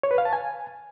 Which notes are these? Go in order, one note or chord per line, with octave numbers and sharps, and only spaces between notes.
C#5
B4
F5
A5
G#5